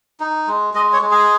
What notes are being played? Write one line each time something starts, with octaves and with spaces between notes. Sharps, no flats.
D#4
G#3
G#3 D#5
C#5
G#3
G#4